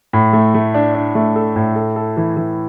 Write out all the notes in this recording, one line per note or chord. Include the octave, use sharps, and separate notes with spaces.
A2
A3
A3
D4
D4
A3
A4
A2
A4
A4
E3
E3